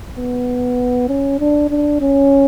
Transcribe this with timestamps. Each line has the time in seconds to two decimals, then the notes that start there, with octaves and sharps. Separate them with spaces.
0.18 B3
1.09 C#4
1.40 D4
1.70 D4
2.01 C#4